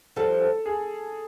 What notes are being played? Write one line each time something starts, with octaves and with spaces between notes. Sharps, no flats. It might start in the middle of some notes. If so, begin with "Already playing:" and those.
F3 G3 A4
A4
G#4